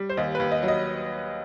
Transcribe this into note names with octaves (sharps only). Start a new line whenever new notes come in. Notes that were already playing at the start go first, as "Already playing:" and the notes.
Already playing: G3
C5
D#2 D#5
B4
D#2
D#5
F#3
D#5